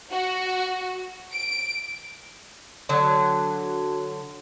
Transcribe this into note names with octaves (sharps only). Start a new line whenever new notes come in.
F#4
D7
D3 F#3